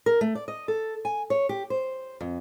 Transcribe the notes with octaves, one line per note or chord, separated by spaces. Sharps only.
A#4
A3
D5
D#5
A4
G#5
C#5
G4
C5
F2